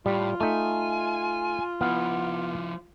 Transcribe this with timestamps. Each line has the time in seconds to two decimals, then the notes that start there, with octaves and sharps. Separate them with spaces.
0.06 A2 G3 F4
0.41 A3 D#4 G#5
1.81 F3 B3 E4 F5